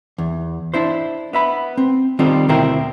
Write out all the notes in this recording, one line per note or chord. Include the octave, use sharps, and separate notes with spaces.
E2
D4 E4 C5
B3 E5 B5
C4
D#3 G3 C4 D#4 F4 A4
D2 B2 C4 E4 A#4 G5